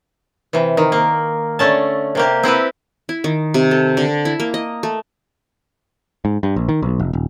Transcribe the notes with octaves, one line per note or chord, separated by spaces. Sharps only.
C3 E3
D#3
A#3
D3 A3 C#4 A5
C3 A#3 G4
C4 E4 G4 B4
E4
D#3
C3
A4
D3
E4
A#3
D#5
A3
G#2
G2
A#1
D#3
B1
F1
D#1